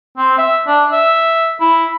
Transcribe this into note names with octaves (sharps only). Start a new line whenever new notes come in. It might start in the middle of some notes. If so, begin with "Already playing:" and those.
C4
E5
D4
E5
E4